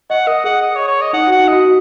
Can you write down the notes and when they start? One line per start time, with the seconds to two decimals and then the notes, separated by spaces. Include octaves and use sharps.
0.10 D#5 F#5
0.27 A#4 D#5
0.44 G#4 F#5
0.62 D#5
0.76 C#5
0.87 C#5
1.01 D#5
1.13 D#4 F#5
1.27 F#4
1.31 F#5
1.40 D#4
1.48 F#4 D#5
1.65 F#4